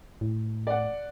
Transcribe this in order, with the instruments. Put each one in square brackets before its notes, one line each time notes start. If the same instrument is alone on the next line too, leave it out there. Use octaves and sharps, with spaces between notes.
[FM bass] A2
[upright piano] D5 F#5